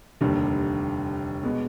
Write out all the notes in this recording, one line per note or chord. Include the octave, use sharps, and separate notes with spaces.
F1 D#2 D3 G3 D4
B2 G#3 B3